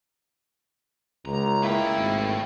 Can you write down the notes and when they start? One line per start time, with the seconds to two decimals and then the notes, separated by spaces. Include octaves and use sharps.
1.25 C#2 A#5
1.62 A2 A#3 E4 G5
1.96 G#1